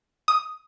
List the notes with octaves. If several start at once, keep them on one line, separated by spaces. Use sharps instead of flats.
D#6